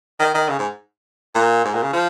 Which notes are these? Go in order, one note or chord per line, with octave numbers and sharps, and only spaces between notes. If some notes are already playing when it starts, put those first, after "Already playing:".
D#3
D#3
C#3
G#2
A#2
G#2
A#2
C#3
F3